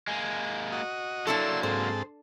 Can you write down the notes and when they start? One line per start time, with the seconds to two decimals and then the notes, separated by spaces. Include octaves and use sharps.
0.08 G#3 A#3 G#4
0.72 F#4 D#5
1.27 F#3 A#3 D4 E4 A4 C6 E6
1.63 G#2 C4 A4 C5